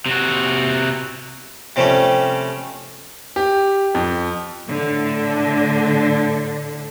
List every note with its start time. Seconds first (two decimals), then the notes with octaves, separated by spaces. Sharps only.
0.06 C3 F#4
1.76 C3 F3 G3 A3 C#4
3.36 G4
3.95 F2
4.69 A2 D3 D4